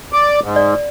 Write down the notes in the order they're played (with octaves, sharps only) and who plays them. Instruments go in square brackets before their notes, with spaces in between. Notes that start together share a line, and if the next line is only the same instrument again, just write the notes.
[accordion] D5
G#2
[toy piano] D5